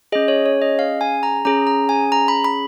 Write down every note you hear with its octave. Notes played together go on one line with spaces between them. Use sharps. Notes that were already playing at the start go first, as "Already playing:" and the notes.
C#4 G#4 D#5
C#5
C#5
D#5
F5
G#5
A#5
C#4 G#4 A#5
A#5
G#5
A#5
B5
B5